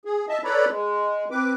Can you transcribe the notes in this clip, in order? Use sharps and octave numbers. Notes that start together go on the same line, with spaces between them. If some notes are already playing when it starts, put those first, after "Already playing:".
G#4
D#5 E5 A5
A4 B4 C#5 D5 A#5 B5
G#3
C4 B4 D6